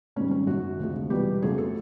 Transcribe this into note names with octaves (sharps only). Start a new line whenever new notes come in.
G#2 D#3 G3 C#4
C#4
F#2 D#3 F#3 F#4
D2 C3 F3 G#3
E2 B2 G3 G4
F2 C#3 F#3 A3 G#4
A4